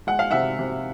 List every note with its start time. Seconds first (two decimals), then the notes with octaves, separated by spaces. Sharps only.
0.07 G#3 F#5
0.19 F5
0.31 C3 E5 F#5
0.59 C3